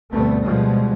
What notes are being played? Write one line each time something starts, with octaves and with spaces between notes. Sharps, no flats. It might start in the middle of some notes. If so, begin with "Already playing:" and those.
D2 G2 B2 A3 B3 C4
B2 F3 G3 G#3